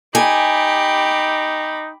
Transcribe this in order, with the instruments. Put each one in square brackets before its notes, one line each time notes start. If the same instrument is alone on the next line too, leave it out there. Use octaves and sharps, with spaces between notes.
[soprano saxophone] D#4 [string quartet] G4 [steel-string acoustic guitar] G#5 [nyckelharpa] B5 D6